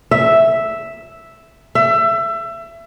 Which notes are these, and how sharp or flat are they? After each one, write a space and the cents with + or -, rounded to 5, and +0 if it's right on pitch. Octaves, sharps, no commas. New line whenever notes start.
E5 +0
E5 +25